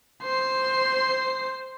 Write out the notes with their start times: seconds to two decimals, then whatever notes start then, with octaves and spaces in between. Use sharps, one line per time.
0.23 C5 C6